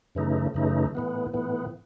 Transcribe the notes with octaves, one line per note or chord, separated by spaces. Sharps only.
F#2 C#3 E3 A3 D#4
F#2 C#3 E3 A3 D#4
A2 E3 B3
A2 E3 B3